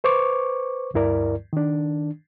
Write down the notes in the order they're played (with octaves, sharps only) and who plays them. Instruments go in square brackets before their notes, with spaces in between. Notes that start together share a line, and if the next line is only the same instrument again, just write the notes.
[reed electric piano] B4 C5 C#6 D6
D2 G2 E4 A#4 D5
D#3 D4